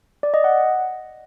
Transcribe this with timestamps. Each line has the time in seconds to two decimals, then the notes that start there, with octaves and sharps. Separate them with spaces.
0.23 D5
0.34 D#5
0.44 F#5